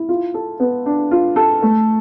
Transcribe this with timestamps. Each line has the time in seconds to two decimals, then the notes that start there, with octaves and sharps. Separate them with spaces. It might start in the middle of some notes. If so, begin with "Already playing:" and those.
Already playing: E4
0.09 F4
0.34 A4
0.60 B3
0.86 D4
1.11 F4
1.36 A4
1.62 A3